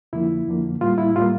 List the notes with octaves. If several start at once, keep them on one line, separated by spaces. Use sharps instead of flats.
F2 D3 F3 A#3 E4
F2 D3 F3 A#3
A2 G3 A#3 F4
E4
A2 G3 A#3 F4